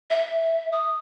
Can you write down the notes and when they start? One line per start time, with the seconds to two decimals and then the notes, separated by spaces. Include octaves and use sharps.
0.10 E5
0.72 D#6